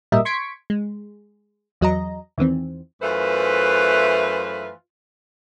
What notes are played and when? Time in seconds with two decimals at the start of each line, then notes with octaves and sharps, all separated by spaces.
0.12 G#1 A#2 G3 A#4 D#5 E5
0.25 C6 C#6 G#6 B6 C#7 D7
0.70 G#3
1.81 E2 F#3 D#5 A#5
2.38 E2 D#3 E3 C4
3.02 F#2 E3 A3 F4 B4 C5